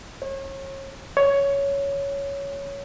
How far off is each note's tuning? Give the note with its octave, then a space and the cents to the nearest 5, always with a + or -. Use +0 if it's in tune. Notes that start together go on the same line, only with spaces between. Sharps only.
C#5 -35
C#5 +10